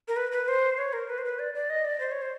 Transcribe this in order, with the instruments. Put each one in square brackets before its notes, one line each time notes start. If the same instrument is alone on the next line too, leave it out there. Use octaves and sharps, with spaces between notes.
[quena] A#4
B4
B4
C5
C#5
A#4
B4
C5
B4
D5
D5
D#5
D5
C5
C#5
C5